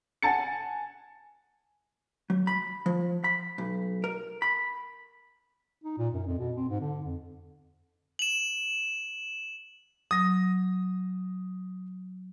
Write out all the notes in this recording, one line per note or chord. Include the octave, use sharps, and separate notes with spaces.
F#5 G#5 A5 A6 C#7
F#3
B5
F3
B5
B1
A#4
B5
D#4
A#2
F#2
F2
B2
C4
G#2
D3
F2
E7 F#7
F#3 D#6 A#6